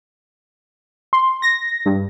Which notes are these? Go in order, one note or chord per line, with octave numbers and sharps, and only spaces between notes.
C6
A#6
G2